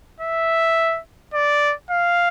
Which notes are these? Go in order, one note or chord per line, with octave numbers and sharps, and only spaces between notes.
E5
D5
F5